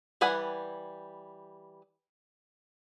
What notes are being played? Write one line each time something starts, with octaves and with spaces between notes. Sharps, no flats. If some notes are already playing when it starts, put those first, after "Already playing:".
E3 G3 B4 F#5 G#5